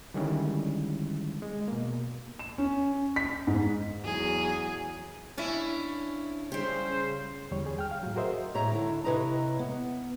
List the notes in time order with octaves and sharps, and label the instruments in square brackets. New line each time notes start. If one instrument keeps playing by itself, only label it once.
[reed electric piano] D3 D#3 G3 G#3 C#4 E4
G#3
B2 A#3
[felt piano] E7
C#4
B6
G#2
[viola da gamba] E2 F#3 G#4
[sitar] C#4 E4 [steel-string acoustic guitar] D4 F5
[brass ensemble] C#3 [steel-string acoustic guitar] G3 G4 [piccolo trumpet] C5
[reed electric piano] E2 D3 G3 C#5
G#4
G5 F6
F5
A2 F#3
F#4 G#4 A#4 C5 D#5 E5
[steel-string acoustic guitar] A2 A3 C#5 D#5 E5 A#5
D3 E4 A5
C3 E4 B4 C#5 D#5 A#5
B3